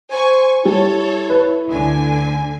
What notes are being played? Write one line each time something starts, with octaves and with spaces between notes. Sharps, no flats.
C5 G#5 C#6
G3 E4 A4 C#5
B4
D2 D3 G#5